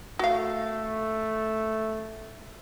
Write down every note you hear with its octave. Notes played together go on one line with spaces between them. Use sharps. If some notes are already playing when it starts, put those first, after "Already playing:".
A3 F#4 F5